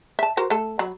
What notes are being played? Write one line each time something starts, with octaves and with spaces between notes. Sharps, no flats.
E5 A5
F#4 A#4 C5
A3 A4
F#3 B5